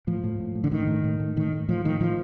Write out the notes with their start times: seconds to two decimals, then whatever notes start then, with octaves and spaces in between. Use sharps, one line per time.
0.07 A2 F3
0.24 A2
0.40 A2
0.55 A2
0.64 D3
0.71 A2 D#3
0.87 A2
1.04 A2
1.20 A2
1.36 A2 D#3
1.52 A2
1.68 A2 F3
1.85 A2 D#3
2.00 A2 F3